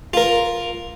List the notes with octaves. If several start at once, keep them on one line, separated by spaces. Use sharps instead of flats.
F4 A#4